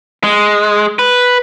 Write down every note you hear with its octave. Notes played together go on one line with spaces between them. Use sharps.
G#3
B4